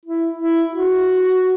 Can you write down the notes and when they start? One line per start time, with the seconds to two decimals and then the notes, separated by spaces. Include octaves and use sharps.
0.05 E4
0.39 E4
0.72 F#4